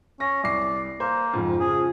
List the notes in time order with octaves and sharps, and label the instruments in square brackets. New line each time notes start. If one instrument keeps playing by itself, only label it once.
[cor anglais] C#4 [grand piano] A#6
[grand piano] C2 C7 [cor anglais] D5
[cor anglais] A#3 [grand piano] C5
[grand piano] F2 G#2 C#3
[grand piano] C#3 F3 [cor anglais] G#4